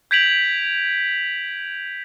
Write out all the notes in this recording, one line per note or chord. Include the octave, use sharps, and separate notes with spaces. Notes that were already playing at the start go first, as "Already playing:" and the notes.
G6 G#6 B6 D7 F7 F#7